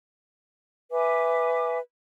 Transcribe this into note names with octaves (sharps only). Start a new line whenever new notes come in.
B4 E5 G#5 D6